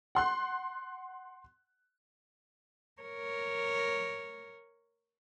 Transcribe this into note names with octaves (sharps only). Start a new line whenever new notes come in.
F#5 C6 F#6
A#4 C#5